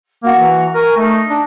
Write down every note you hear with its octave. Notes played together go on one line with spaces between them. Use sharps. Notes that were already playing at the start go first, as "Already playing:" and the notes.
A#3 F#4 A#5
E3
A#4 G#5 C#6
A3 D#4
D4